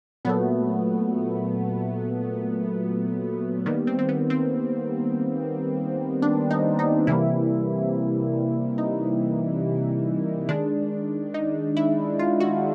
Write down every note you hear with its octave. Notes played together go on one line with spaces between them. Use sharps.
A#2 F#3 A3 B3
D#3 G3 A#3 B3
C4
C4
B3
C4
D4
D#4
D#4
C3 E3 G3 A#3 E4
D#4
D#3 G#3 D4
D#4
E4
F4
F#4